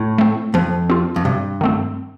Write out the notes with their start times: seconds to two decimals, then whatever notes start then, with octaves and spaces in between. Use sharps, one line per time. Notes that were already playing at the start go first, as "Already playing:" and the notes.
Already playing: A2
0.18 A3 C4
0.54 F2 F3
0.90 C4 F4
1.16 F2
1.25 G2 C3
1.61 D#3 A3 C4